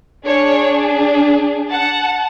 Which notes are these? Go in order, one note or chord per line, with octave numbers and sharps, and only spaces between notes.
D4 G#4 C#5
F#5 A5